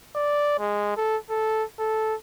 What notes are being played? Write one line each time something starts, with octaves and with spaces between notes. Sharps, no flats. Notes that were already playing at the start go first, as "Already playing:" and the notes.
D5
G#3
A4
A4
A4